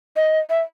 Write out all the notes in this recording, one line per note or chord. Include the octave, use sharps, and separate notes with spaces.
D#5
E5